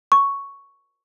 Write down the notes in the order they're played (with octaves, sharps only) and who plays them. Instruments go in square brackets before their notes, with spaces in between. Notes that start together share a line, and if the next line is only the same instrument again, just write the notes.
[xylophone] C#6